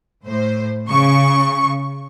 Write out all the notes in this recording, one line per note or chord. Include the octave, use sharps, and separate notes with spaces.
A2 C5
C#3 C#6